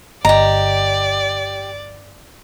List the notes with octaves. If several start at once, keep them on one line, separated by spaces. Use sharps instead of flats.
G1 G4 D5 D#5 A#5